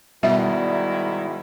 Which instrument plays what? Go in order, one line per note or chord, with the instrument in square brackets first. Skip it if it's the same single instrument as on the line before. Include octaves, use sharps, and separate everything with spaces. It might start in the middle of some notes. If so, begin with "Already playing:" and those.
[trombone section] G#2 D#3 E4 [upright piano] B2 [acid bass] G3 [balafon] E5